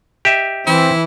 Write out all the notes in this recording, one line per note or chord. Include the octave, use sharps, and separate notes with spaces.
G4 D#5 E5
E3 C4 E4